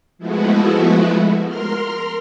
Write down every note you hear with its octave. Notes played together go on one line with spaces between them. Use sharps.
F3 G#3 A3 B3 E4 F#4
A#4 C6 F6